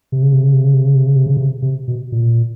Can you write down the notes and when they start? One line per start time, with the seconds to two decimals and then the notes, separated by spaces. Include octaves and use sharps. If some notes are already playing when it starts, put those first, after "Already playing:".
0.12 C3
0.23 C#3
0.33 C3
0.43 C#3
0.54 C3
0.64 C#3
0.74 C3
0.85 C#3
0.95 C3
1.06 C#3
1.16 C3
1.26 C#3
1.37 C3
1.62 C3
1.88 B2
2.12 A#2